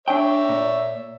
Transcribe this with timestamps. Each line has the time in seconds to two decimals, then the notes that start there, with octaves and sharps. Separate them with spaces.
0.08 D4 C#5 E5 G5
0.49 A#2